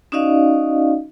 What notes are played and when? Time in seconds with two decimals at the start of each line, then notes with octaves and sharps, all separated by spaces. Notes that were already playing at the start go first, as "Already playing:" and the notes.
0.12 C#4 D#4 F#4 D5 D#5 F5